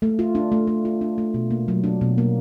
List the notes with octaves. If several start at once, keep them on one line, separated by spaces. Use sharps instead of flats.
A3
F4
D4
A3
A3
F4
D4
A3
B2
A#3
F#3
D4
B2
A#3